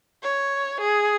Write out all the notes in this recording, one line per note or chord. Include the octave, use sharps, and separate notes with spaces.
C#5
G#4